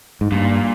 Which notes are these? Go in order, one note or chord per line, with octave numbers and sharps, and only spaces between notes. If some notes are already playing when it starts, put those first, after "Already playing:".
G#2
G2 A#2